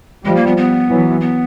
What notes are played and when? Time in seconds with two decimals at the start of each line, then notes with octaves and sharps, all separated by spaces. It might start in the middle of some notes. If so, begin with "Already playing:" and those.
0.24 F3 G3 G#3
0.36 A#3
0.47 B3
0.57 B3
0.89 E3 F#3
1.21 B3